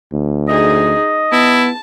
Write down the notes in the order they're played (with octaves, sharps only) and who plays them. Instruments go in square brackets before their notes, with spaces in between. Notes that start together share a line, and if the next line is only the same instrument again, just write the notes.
[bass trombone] D2
[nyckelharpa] D#4 G#4 [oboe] D#5
[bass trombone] B3 [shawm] E4 [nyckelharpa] A5